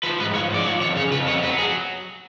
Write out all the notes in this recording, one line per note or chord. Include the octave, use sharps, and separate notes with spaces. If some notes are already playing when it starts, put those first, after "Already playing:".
F3 B4
G#2 B4
F3 C#5
G#2 D5
F3 C#5
F2 C#5
C#3 C#5
F2 B4
F#3 C#5
F#3 B4
F#3 G#4